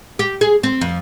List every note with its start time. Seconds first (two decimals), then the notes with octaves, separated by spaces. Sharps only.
0.19 G4
0.41 G#4
0.63 C4
0.81 F2